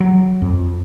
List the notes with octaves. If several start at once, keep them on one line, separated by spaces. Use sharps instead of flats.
F#3
F2